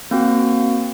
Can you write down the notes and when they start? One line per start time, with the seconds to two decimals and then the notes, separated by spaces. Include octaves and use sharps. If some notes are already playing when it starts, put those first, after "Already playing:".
0.11 A#3 C4 F#4